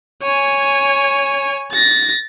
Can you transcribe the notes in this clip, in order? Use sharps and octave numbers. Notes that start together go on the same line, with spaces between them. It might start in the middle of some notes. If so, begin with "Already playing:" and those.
C#5 G#5
A6 A#6